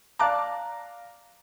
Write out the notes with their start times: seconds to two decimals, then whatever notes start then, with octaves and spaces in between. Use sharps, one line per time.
0.19 D5 F5 A5 A#5 D6 F#6